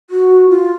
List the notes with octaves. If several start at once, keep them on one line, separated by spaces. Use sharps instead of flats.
F#4
F4